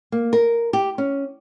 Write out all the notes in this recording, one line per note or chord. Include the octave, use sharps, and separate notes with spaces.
A#3
A#4
G4
C#4